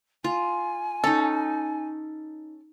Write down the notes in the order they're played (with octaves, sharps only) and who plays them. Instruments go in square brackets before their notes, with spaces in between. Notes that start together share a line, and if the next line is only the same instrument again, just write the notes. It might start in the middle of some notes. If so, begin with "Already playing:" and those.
[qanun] F4 [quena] G#5
[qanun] C#4 D#4 [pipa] A4